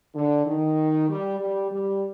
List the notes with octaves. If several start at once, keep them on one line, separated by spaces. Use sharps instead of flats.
D3
D#3
G3
G3
G3